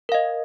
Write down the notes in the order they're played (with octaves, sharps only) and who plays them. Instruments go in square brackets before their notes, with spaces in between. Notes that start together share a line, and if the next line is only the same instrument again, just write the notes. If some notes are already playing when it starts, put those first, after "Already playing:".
[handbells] A#4
F5
D#5